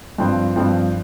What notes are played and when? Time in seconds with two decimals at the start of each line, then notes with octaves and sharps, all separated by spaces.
0.18 G2 F3 C4
0.56 G2 F3 C4